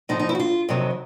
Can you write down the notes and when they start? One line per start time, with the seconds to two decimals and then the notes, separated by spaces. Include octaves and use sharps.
0.09 A2 F3 D#4
0.19 D#4
0.29 E4
0.35 F#4
0.40 F4
0.69 F2 C3 D#3 F#3